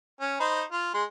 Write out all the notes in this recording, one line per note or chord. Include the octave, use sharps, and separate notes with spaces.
C#4
D#4 C5 B5
F4
G#3 C6